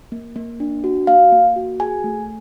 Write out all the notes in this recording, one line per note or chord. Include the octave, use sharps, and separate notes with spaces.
A#3
A#3
D4
F#4
A#3 F5
A#3
F#4
G#4 G#5
A3